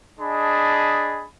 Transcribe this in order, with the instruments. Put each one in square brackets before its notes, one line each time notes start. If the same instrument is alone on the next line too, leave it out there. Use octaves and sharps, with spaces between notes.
[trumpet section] D4 G#4 D#5 A5 B5